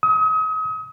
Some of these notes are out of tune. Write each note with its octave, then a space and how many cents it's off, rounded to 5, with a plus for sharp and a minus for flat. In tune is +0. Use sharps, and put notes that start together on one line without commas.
D#6 +35